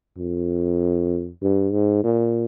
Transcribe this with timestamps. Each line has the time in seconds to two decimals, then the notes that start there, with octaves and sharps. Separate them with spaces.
0.18 F2
1.42 G2
1.73 G#2
2.04 A#2